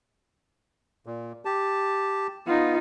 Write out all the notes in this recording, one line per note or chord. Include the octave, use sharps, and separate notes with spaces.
A#2
G4 A5
B3 D#4 F4